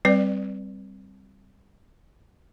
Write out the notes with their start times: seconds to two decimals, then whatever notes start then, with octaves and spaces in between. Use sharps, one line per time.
0.05 G3 C4 B4 D5